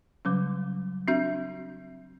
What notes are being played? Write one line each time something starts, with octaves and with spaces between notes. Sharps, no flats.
C#3 F#3 G3 C#4
C4 D4 F#4 E5 G6